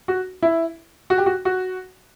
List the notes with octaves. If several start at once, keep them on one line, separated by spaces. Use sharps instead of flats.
F#4
E4
F#4
G4
F#4
F#4